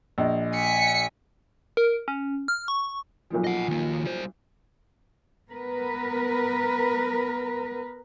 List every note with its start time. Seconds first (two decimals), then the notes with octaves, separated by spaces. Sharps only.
0.18 A#1 D#5
0.55 G#5 B6 C#7
1.77 A#4
2.08 C#4
2.48 F6
2.68 C#6
3.30 B1 A#2 F3
3.44 D#5 F#5
3.68 D#3 A#3
4.05 G3 C5
5.50 B3 A#4 B4